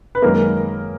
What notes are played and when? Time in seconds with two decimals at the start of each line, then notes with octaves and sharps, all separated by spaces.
0.15 B4
0.22 F#2 D#3 G#3 A#3 A#4